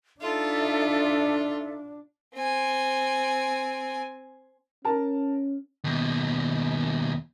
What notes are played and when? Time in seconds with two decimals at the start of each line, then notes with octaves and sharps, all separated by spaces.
0.21 D4 D#4 F4 A4 E5
2.35 C4 G#5
4.85 C#4 A#4 A5
5.84 D#2 B2